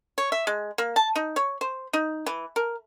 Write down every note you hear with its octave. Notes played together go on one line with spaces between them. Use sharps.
C#5
E5
G#3
A#3
A5
D#4
C#5
C5
D#4
E3
A#4